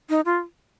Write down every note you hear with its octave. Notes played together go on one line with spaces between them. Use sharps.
D#4
F4